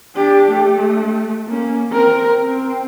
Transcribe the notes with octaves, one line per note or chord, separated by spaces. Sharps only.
D4 G4
A3
A#3 C#4
C4 A#4
C4